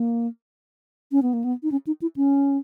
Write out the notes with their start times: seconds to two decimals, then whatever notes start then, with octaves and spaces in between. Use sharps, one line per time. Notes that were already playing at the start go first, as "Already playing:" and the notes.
Already playing: A#3
1.12 C#4
1.22 B3
1.33 A#3
1.44 B3
1.63 D#4
1.72 C#4
1.87 D#4
2.02 E4
2.16 C#4